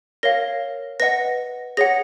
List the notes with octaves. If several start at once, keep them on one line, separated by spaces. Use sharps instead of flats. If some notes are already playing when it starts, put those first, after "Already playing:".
A#4 C#5 F5 A#6
B4 D#5 F#5 A#6
G#4 C#5 F#5 A#6